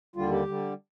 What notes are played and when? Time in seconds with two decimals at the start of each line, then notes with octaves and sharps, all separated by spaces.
0.16 D#2 D3 G3 F4
0.31 G4
0.47 D3 G3